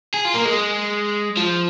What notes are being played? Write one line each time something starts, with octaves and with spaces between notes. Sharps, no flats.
G#4
F4
A#3
G#3
F3